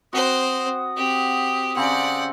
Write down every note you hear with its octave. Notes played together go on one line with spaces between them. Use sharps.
C4 F#4 C5 D#6
C4 G4
C#3 C4 G4 D5 F#5